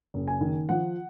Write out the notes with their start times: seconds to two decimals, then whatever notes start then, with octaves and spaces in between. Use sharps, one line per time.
0.14 F#1
0.28 G#5
0.41 D#3
0.69 F3 F#5